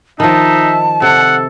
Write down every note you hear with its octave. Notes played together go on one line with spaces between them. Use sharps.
D#3 F3 D#4 E5 A5
C3 A4 F#5